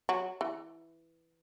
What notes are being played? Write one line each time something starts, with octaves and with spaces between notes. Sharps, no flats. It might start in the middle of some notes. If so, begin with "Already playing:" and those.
F#3
E3